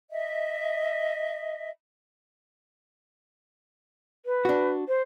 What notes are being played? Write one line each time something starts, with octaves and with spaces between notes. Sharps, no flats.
D#5 E5
B4
D4 F#4
C5